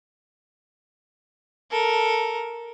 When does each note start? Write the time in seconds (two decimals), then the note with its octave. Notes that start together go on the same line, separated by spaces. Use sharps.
1.71 A4 A#4